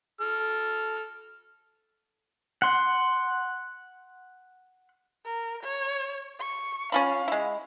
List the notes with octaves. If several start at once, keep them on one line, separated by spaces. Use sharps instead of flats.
A4 F6
F#5 C6
A#4
C#5
C#6
C#4 F4 F5 B5
G#3 E4